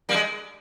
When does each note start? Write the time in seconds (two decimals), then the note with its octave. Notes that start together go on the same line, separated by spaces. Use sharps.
0.09 G3 A#3
0.14 G#3